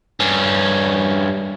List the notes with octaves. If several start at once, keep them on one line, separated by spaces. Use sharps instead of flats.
G2 C#4